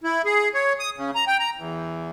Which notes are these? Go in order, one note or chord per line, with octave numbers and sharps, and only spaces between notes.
E4
G#4
C#5
D#6
C#3
A#5
G5
A#5
E2